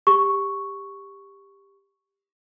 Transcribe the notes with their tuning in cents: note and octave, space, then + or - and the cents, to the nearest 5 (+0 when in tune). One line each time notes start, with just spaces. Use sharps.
G4 +15 C#6 +0